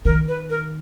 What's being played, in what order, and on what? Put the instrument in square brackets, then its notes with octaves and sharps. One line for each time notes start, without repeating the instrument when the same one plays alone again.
[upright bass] D#3 [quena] A#4
[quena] B4
A#4